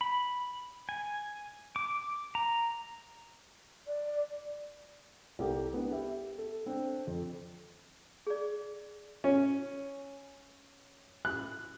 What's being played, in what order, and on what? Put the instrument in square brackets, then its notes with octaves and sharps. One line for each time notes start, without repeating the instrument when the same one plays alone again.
[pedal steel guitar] B5
G#5
D6
A#5
[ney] D5
[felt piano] C2 G4 A4 A#4
B3 D4
G4 E5
A4
C4 D4
F2
[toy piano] G#4 D5
[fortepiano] C#4
F#6